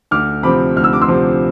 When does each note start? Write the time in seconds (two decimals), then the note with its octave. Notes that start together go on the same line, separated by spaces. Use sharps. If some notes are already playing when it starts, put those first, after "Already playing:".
0.11 D2 D6 F6
0.43 C3 F3 C4 B5 D6
0.76 D2 F6
0.84 E6
0.93 D6
1.01 C6 E6
1.08 C3 F3 C4